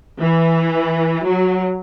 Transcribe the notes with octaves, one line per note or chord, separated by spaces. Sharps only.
E3
F#3